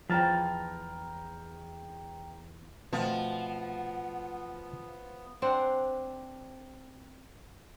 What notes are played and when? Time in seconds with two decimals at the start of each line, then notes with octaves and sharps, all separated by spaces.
0.10 E2 F3 G5 A5 A#5 F6
2.93 B2 F3 A3 B3 C4 F#5
5.42 C4 D4 C5 F#5